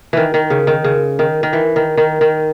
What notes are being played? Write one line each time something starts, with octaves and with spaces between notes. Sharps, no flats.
D#3 E3
D#3
C#3
D#3
C#3
D#3
D#3
E3
D#3
D#3
D#3